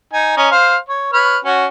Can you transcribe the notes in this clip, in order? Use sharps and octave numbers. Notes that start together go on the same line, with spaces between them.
D#4 G#5
C#4 D#5 A#5
C5 F5
C#5
B4 C#5 F6
C#4 F#4